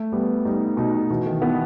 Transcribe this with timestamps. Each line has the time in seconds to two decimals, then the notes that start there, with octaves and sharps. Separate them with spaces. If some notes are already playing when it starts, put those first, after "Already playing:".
Already playing: A3
0.12 G3 B3
0.45 G3 D#4
0.77 B2 D#4
1.10 B2 E3
1.26 D#3
1.42 E3 B3